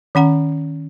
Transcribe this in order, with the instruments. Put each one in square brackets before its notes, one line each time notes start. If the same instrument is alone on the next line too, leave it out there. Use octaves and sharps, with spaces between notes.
[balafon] D#3 C#4 F#5 A#5